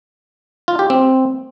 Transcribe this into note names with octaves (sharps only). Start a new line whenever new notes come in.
F4
G4
C4